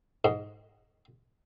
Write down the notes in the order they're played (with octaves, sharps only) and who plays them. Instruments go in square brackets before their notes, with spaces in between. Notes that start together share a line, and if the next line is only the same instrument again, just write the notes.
[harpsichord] G#2